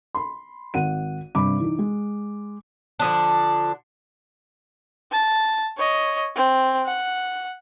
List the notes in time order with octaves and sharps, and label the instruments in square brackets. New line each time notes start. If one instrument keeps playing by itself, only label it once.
[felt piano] B5 C6
G#1 F#5 D#7
G2 C3 B5 D6
E3 D#4
G#3
[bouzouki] D3 F3 D4
[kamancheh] A5
C#5 D#5
C4
F#5